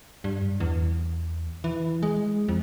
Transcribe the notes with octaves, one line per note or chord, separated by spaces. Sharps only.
G2
E2
E3
G#3
F2